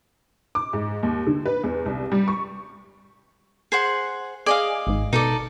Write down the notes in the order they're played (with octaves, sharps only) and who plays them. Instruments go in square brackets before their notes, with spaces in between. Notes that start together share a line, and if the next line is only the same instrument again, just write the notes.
[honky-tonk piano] D6
G#2
D#2
D3
B4
E2
C2
G3
C#6
[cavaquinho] G#4 C5 F#5
[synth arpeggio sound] G#4 [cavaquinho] D5 D#5 F5
[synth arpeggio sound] G#1 G#2
[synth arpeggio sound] B2 [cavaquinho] D#4 A4 D5